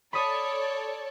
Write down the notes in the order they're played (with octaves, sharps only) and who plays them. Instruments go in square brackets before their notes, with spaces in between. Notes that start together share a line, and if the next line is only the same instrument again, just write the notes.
[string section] A4 C#5 D5 [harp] B5 D#6